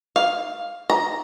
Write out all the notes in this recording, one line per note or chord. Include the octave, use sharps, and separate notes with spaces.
F5
A#5